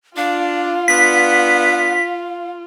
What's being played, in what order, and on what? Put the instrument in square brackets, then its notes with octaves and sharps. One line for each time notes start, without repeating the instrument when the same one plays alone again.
[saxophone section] D4 [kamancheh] F4 [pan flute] F5
[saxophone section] B3 D4 [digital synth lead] B6